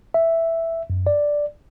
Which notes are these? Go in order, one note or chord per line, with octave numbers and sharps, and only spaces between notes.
E5
F#2
D5